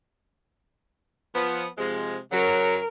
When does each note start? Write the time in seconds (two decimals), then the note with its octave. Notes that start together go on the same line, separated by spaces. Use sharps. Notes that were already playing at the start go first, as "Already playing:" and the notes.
1.35 F3 B3
1.78 C3 F3 G#3
2.32 F#2 C#3 F#3 A#4